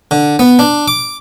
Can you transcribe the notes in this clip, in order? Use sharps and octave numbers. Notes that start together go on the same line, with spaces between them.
D3
B3
D4
D6